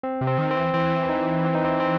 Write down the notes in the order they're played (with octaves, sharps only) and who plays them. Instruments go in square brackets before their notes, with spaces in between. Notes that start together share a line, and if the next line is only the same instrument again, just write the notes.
[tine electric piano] C4
[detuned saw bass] C3
[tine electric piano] C4
[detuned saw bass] D#3
[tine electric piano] C4
[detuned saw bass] E3
[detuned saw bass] E3 [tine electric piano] C4
[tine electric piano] D#4
C4
D#4
C4
C4